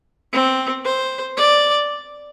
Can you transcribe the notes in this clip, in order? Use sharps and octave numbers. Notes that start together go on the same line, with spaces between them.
C4
C5
D5